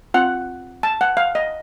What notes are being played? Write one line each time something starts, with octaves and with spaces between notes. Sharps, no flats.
C4 F4 F#5
A5
F#5
F5
D#5